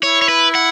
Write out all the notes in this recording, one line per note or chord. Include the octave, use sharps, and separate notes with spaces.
E4 C#5
C#5
B4
F#5